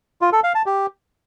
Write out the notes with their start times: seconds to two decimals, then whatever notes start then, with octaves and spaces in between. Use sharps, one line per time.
0.22 F4
0.33 A4
0.44 F5
0.55 A5
0.66 G4